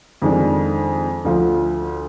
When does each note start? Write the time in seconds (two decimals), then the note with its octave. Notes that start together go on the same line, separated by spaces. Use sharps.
0.22 F2 D#3 G#3 D4
1.25 D2 D3 F3